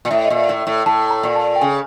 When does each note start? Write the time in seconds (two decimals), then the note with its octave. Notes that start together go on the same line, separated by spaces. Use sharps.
0.05 A#2
0.11 A2 E5
0.25 D#5
0.30 A#2
0.36 E5
0.49 A2
0.62 E5
0.67 A2
0.86 A2 A5
1.07 A5
1.10 A#5
1.23 A#2
1.35 A5
1.56 G5
1.61 C#3 G#5